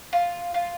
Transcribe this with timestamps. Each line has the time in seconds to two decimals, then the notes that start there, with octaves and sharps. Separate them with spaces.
0.13 F4
0.54 F4